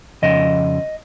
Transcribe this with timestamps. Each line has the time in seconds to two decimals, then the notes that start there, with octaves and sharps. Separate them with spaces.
0.22 F2 C#3 F3 C#4 D#5